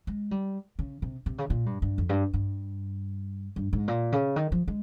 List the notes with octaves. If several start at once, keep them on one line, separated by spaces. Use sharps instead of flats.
G#3
G3
C#3
C3
C3
C#3
A#2
G2
G2
F2
G2
G2
G2
G#2
A#2
C#3
D#3
F3
G#3